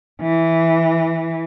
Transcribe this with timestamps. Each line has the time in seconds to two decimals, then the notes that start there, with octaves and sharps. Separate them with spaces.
0.22 E3